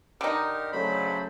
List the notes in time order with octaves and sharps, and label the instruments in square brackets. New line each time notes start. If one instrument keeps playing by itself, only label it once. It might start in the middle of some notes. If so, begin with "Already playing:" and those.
[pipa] D3 D#4 [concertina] G4 A#4
[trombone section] C#3 F#3 A3 [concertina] C5 B5